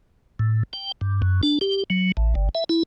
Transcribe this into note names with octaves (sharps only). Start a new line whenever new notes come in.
A2
G5
G2
F#2
D4
G4
F#3
A1
G1
E5
E4